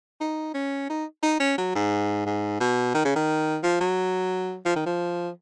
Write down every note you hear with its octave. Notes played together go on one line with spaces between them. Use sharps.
D#4
C#4
D#4
D#4
C#4
F#3
G#2
G#2
B2
D#3
C#3
D#3
F3
F#3
F3
D#3
F3